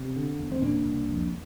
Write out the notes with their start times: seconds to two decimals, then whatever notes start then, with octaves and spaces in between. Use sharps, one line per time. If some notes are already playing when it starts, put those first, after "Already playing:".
Already playing: C3
0.16 D3
0.39 E2
0.52 C4
0.61 A#2 A#3 D4
0.85 C2
1.09 F2